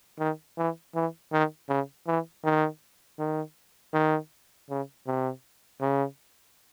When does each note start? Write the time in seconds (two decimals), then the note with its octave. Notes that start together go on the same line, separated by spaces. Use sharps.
0.19 D#3
0.58 E3
0.95 E3
1.32 D#3
1.69 C#3
2.07 E3
2.44 D#3
3.19 D#3
3.94 D#3
4.70 C#3
5.07 C3
5.81 C#3